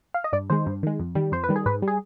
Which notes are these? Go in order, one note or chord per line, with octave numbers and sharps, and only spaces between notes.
F5
D#5
G2 D5
D#3 G#3 C5
G2
D#3 G#3
F2
D#3 G3
F2 C5
B4
D#3 G3
G#4
G#2 B4
G3
G#4